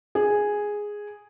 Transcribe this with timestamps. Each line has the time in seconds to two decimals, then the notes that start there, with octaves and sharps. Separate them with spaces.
0.15 G#4